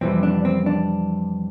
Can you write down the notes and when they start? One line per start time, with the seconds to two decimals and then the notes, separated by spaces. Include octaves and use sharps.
0.01 F2 C3 E3 G3 C4
0.23 D4
0.45 C4
0.66 D4